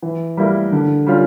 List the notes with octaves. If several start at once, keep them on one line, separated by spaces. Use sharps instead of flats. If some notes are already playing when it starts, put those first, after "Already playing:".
E3
G3 A#3 E4 A#4
D3
G3 C#4 F4